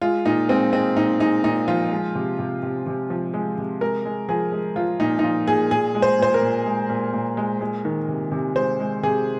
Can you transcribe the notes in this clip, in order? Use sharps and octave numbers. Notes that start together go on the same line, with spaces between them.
G#3 F4
A#2 D#4
G#3 C4
G#3 C4
A#2 D#4
G#3 D#4
A#2 D#4
F3 F4
G#3
C3
C3
C3
C3
F3
G#3
C3
G#3 A#4
G#3
F3 G#4
G#3
F3 F4
A#2 D#4
D#4
F3 F4
A#2 G#4
A#2 G#4
G#3
C5
A#2 C5
A#4
A#2
G#3
A#2
A#2
G#3
G#3
D#3
C3
C3
G#3 C5
G#3
C3 G#4